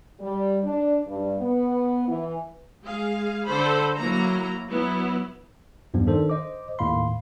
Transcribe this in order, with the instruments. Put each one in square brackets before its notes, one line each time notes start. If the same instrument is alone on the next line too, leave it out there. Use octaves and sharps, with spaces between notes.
[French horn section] G3
D4
G2
B3
E3
[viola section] G#3 G#4 F5
D3 A4 C5 B5
F#3 A#3 E4 A#5
F#3 B3 E4
[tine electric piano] E2 G2 F3 B3
D#3 D4 A4 C5
C5 D#5 D6
D#2 A2 F5 B5 C6